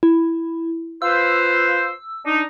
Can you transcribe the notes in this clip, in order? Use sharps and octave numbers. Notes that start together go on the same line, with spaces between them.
E4
F4 B4 C5 E6
D4 D#4